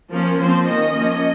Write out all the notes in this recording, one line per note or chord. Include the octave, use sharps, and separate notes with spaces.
F3 A#3 C#4 A#4
F3 C4 C5
D#3 A#3 C#4 D#5
F3 A#3 C#4